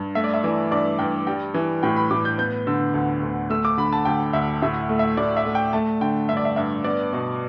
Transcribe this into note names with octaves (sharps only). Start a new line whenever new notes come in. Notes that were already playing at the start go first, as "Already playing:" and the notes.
Already playing: G2
A3 E5
D5
E5
E3 D5
G2 D5
G2 G5
G3 G5
E3
A2 G5
B5
A2 D6
G6
B3 G6
D3 E6
D2
D2
A3 E6
D6
D3 B5
A5
D2 G5
D2 E5
A2 E5
A3
E5
A2 D5
E5
A3
G5
A3 A5
D3 G5
G2 E5
D5
E5
G2 E5
B3 D5
B2